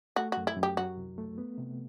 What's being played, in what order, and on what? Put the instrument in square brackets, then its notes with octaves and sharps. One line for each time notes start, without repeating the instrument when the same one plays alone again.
[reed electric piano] A3 [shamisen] F#4
[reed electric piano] F#2 [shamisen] F#4
[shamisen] E4
[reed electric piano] F#2
[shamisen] G4
[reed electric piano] F#3 [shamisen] F#4
[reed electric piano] C2
A3
B3
C3